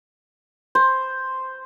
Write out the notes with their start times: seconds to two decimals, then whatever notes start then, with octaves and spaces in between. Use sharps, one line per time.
0.75 C5